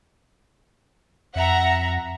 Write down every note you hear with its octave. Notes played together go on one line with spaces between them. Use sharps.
F2 E5 F#5 A#5